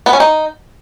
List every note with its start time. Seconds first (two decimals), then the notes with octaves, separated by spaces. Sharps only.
0.06 B3
0.13 C#4
0.20 D#4